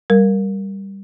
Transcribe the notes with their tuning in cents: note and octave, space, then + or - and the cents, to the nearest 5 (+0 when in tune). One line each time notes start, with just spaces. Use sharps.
G3 +0 A#4 +0